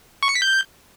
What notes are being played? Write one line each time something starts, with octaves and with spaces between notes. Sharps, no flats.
C#6
C#7
B6
G6